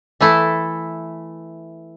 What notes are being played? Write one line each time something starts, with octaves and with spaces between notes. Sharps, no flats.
E3 A3 E4 A4